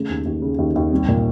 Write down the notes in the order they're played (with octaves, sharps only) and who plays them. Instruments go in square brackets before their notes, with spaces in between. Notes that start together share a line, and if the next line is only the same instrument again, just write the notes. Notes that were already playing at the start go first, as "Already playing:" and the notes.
Already playing: [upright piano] C#3 A3
D#2
D#2
C#3
D#2
D#2
C2
A#2